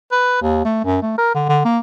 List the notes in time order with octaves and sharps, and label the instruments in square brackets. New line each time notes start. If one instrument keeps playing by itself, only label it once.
[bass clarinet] B4
D#2
A3
F#2
A3
A#4
D3
D3
A#3